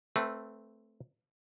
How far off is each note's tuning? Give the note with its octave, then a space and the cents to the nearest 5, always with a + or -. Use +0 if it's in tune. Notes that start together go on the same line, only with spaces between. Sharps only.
A3 +0 C4 +0 B4 -25